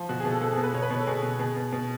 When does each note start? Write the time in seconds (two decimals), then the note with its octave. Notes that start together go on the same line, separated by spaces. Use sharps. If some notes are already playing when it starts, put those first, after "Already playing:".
Already playing: F3
0.09 B2 F#4
0.20 G#4
0.25 B2
0.31 A4
0.41 B2 A4
0.52 G#4
0.58 B2
0.64 B4
0.74 B2 C#5
0.82 B4
0.91 B2 C#5
0.99 A4
1.07 B2 G#4
1.23 B2
1.39 B2 G#4
1.56 B2
1.73 B2